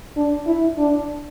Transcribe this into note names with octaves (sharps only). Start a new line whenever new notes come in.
D4
E4
D4